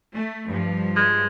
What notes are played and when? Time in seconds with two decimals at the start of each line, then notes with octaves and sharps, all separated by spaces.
0.14 A3
0.48 G2 F3
0.96 G#3